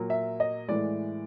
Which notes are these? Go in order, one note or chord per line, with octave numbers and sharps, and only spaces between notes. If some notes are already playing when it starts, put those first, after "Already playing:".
Already playing: A#2 F#3 A#3
E5
D#5
A2 E3 G#3 D5